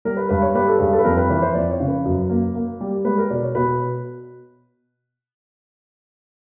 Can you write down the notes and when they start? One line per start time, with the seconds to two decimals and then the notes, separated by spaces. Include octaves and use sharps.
0.05 G3 A#4
0.17 B4
0.29 G2 B4
0.42 C#5
0.55 G3 B4
0.68 A4
0.80 G2 G#4
0.93 A4
0.99 B4
1.04 F2 A#4
1.17 B4
1.29 E3 B4
1.42 C5
1.54 F2 D5
1.71 C#5
1.80 C#3
1.88 B4
2.05 F#2
2.29 A#3
2.55 A#3
2.81 G3
3.04 G#3 B4
3.18 A#4
3.30 B2 D5
3.43 C#5
3.55 B2 B4